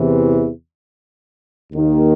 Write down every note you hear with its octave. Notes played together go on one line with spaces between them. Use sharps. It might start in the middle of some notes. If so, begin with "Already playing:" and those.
Already playing: E2 C3 E3
D#2 D#3